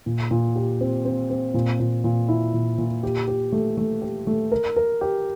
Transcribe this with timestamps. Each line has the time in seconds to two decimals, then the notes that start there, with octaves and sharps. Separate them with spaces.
0.06 A#2
0.31 A#2
0.56 G4
0.81 C4
1.05 C4
1.30 C4
1.54 A#2
1.80 A#2
2.04 A#2
2.29 E4
2.54 A#2
2.78 A#2
3.03 G4
3.28 G4
3.52 A3
3.77 A3
4.02 G4
4.27 A3
4.52 A#4
4.76 A#4
5.01 G4